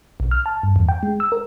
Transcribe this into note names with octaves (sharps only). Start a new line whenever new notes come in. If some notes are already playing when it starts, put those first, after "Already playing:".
B1
F6
A5
G2
E2
G5
G#3
E6
A#4